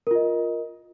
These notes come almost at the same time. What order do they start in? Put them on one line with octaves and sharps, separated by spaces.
A#4 F4 D#5